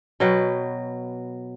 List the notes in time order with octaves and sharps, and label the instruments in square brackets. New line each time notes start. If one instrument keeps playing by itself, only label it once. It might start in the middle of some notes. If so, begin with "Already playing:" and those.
[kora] B2 F#3 B4 G5